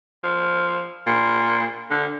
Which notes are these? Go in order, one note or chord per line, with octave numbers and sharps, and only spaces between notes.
F3
A#2
D3